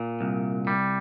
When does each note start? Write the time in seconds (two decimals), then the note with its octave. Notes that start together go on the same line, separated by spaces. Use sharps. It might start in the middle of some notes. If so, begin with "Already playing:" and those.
Already playing: A#2
0.21 C2
0.67 G3